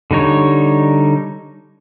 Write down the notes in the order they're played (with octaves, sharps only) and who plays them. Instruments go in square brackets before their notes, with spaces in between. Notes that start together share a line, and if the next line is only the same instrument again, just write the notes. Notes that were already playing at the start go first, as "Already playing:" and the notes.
[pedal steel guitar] D3 G3 D#4 C#5